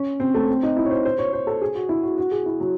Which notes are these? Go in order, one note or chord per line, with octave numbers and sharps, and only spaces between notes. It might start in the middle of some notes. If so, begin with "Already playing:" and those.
Already playing: C#4
C4
A3
C4
D#4
E4
C#5
C5
C5
C#5
C5
A4
G#4
F#4
E4
F#4
F#4
G#4
E4
F#3